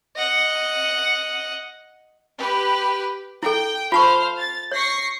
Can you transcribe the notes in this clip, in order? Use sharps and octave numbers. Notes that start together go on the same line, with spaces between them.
D#5 F#5
G4 B4
E4 A4 G5
F4 C5 F5 A5 C#6
A6
C#5 C#6 A#6 C7